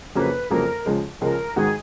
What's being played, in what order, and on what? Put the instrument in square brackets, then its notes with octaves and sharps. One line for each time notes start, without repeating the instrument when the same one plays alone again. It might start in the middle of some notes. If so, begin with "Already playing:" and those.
[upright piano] F2 C#3 F#3 A#3 [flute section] B4
[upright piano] F2 C#3 F#3 A#3 [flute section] A#4
[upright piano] C#2 C#3 F3 G#3
[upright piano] C#2 C#3 F3 G#3 [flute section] A#4
[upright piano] G#2 D#3 G#3 D#4 F#4 [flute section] G#4